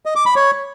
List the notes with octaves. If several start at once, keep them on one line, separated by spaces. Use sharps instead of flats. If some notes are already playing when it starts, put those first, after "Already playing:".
D#5
D6
B5
C#5